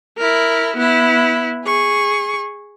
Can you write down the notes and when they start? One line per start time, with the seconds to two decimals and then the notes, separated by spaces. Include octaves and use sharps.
0.18 E4 A#4
0.76 B3 E4
1.65 G#4 C#6